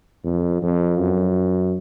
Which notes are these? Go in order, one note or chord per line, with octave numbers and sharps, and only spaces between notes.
F2
F2
F#2